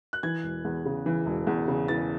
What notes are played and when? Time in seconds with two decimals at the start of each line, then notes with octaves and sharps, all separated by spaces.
0.13 F#6
0.23 E3 G#6
0.43 E1
0.65 E2
0.86 C#3
1.06 E3
1.26 E1
1.47 E2
1.68 C#3
1.88 E3 A6